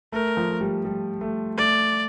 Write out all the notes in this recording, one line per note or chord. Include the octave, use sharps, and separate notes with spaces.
A3 A#4
F3
A3
G3
G3
A3
A3 D5